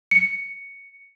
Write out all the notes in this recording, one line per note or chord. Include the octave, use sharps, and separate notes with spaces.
C#7